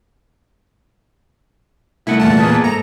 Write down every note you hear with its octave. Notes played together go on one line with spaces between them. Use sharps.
C2 A3 E4 F#5
E2 A#2 A5
A#3 B3 G#4
G#2 A4 A#5